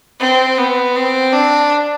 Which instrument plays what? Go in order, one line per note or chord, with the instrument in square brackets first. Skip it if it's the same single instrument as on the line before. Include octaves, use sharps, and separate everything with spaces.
[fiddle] C4
B3
C4
D4